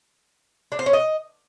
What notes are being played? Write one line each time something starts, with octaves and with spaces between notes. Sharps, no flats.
D4
C5
C#4
D#5